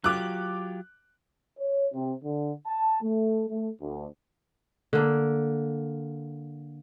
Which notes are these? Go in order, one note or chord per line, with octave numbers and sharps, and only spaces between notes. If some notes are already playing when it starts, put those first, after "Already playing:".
F#3 F4 G4 D6 F#6
C#5
C3
D3
A5
A3
A3
D2
D3 A#3